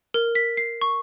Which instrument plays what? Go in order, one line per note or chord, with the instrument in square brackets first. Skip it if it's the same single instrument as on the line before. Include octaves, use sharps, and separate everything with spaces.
[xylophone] A#4
B6
C7
C#6